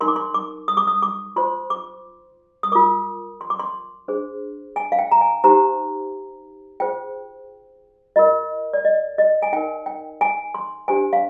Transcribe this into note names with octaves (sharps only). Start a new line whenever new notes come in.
D#4 A#4 C6
D6
C6
D6
D#6
D6
D#6
D6
F4 C5 C6
D6
D#6
F4 A#4 D6
C6
D6
C6
D4 G#4 C5
G#5
F5
G5
A#5
G#5
D#4 G4 C5 A#5
F4 G#4 C5 G5
F4 A#4 D#5
D5
D#5
D#5
G#5
D#4 A#4 G5
G5
G#5
C6
D4 G4 C5 G#5
F5